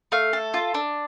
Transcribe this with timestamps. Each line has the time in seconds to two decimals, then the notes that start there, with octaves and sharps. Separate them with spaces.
0.12 A3 F5
0.33 A4
0.54 F4
0.74 D4